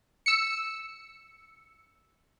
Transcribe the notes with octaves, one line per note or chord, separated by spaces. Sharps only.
E6 C#7